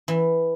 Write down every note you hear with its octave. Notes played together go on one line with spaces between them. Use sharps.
E3